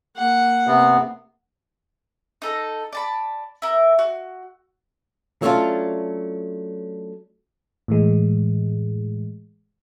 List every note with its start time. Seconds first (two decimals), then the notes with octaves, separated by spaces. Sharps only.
0.17 A#3 F#5
0.67 C3 B3
2.42 D#4 A4 A#5
2.93 D5 A5 B5
3.62 E4 A#4
3.99 F#4
5.42 F#3 A3 C#4 D4 F4
7.88 A2 E3 G#3